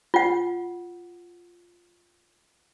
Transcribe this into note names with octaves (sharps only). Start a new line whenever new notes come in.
F4 F#5